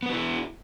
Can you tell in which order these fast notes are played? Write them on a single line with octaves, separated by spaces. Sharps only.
B3 B4 F#4 E4